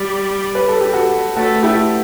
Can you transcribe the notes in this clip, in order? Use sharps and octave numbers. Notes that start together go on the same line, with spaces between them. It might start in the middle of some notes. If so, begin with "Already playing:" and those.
Already playing: G3
B4
A4
G4
F#4 A4
A3 F#4 A4
E4 G4